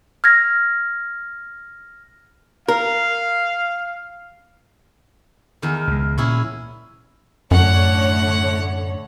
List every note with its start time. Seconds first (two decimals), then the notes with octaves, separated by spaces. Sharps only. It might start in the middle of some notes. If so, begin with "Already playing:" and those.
0.24 F6 G#6 A#6
2.68 A#4 F5
5.62 E2 D#3
5.87 C#2 G#3
6.18 A#2 C#4 E4 G#4
7.51 F#2 A2 D3 C#5 F#5